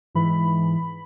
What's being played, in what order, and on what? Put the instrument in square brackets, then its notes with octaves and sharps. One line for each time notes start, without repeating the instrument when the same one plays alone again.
[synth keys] G#2 E3 B5